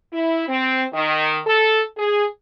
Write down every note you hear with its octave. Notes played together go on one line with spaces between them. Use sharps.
E4
C4
D#3
A4
G#4